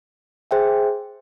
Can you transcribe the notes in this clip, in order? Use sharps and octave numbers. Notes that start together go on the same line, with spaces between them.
G#4 C5 E5 G5